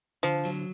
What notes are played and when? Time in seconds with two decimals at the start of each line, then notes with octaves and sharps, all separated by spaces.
0.23 D3 F3
0.45 F#3